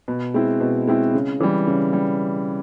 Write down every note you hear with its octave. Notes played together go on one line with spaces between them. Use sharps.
B2
G#3 C4 E4
B2
G#3 C4 E4
C#3
E3 G3
C#3
G3